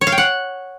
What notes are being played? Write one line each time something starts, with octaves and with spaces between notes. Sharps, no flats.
C#5
F5
G5
F#5